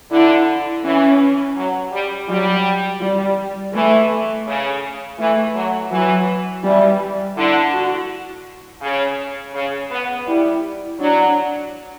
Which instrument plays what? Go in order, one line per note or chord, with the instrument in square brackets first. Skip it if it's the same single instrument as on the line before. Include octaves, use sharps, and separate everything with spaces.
[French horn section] D3 [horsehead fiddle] E4
[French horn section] E3 [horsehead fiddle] C#4
[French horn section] F#3
G3
[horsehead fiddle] F#3 [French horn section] G3
[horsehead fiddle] G3
[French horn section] E3 [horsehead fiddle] A3
[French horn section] C#3
[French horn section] E3 [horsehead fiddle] A3
[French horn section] F#3
[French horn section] E3 [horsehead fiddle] F#3
[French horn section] E3 [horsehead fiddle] G3
[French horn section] D3 [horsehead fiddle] E4
[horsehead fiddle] F#4
[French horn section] C#3
C#3
B3
[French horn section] G3 [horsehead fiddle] E4
[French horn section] F#3 [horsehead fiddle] D4